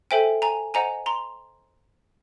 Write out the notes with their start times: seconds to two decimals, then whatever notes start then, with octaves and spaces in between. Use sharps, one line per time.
0.11 A4 C5 E5 G5 G#5
0.42 G#5 A#5
0.74 C5 D#5 F#5 G#5 A#5
1.06 A#5 C6